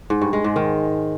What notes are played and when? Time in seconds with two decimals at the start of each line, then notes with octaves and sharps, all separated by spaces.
0.10 G#2
0.22 G2
0.33 G#3
0.44 G#2
0.56 D#3